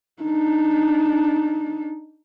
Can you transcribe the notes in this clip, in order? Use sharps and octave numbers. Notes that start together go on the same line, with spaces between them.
D4 D#4